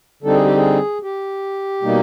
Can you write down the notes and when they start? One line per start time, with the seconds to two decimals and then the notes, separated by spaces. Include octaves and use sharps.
0.23 D3 G3 C4 D#4 A4
0.34 G#4
0.45 G4
0.57 G#4
1.03 G4
1.82 B2 G3 A#3 D#4